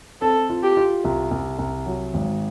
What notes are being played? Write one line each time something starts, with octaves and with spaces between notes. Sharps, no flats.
C4 A4
F4
G4
F4
C2
C2
C2
F#3
G#1